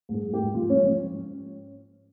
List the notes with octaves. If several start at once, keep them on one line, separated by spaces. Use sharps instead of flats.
G#2 G#4
G#2
G#2 G4
F3 F4
G#2 C#4
F3 C#4